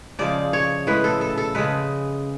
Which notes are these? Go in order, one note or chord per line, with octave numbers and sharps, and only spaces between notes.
C#3 F3 G#3 D5
C#5
A2 G#3 B4
A4
A4
A4
C#3 G#3 B4